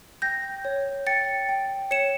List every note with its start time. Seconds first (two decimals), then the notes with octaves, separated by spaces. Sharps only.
0.22 G5 G6 A#6
0.65 C#5
1.07 G5 A6 C#7
1.49 G5
1.91 C#5 C#7 E7